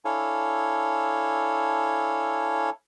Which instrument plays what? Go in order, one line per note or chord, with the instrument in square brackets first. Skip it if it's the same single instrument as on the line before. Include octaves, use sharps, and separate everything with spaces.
[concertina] D4 E4 A4 C#5 F5 G#5